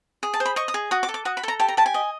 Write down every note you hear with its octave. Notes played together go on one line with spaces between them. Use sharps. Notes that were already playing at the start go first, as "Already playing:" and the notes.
G#4
A5
C5
B5
D#5 C#6
D#6
G#4
F#4 D#6
D6
A4
D6
F#4 D#6
B5
A4 A#5
G4 A5
A#5
G4 A5
G#5
D#5